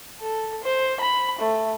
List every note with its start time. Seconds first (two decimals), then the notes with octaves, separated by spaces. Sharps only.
0.20 A4
0.63 C5
1.00 B5
1.39 A3